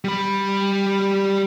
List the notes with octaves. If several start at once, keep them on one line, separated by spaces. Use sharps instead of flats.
G3 B5